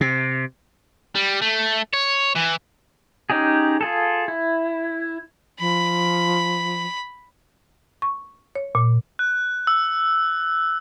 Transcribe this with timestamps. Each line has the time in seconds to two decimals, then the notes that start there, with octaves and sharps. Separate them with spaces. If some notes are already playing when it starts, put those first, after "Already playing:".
0.01 C3
1.15 G3
1.42 A3
1.94 C#5
2.36 E3
3.30 C#4 D#4 G4 G#4
3.81 F4 G#4 A4
4.28 E4
5.60 F3 B5
8.02 C#6
8.55 C#5
8.75 A#2
9.19 F#6
9.67 E6